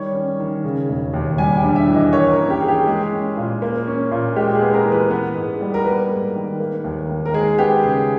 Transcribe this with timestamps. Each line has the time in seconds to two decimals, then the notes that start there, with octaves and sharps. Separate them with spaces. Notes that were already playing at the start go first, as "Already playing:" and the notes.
Already playing: D#3 G3 C#5
0.14 C#4
0.40 D#3
0.64 C#3
0.89 E1
1.13 D#2
1.38 G3 G#5
1.57 G5
1.63 G2
1.76 E5
1.88 E3
1.95 D#5
2.13 A#3 C#5
2.31 A#4
2.38 C#4
2.50 G4
2.61 E3 G#4
2.68 G4
2.87 G#3 G#4
3.12 C#4
3.37 A#2
3.62 A#3
3.87 C#4
4.11 A#2
4.36 G#3 G4
4.55 G#4
4.61 B3
4.74 A#4
4.85 E3
4.92 B4
5.10 B3
5.35 G#2
5.61 G3
5.74 A#4
5.85 A#3 B4
6.10 G#2
6.35 D#3
6.60 A#3
6.84 D#2
7.09 D#3
7.26 A#4
7.33 G#3 G#4
7.58 B3 G4
7.84 C#3 G#4